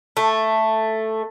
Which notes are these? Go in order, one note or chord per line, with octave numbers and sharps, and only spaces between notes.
A3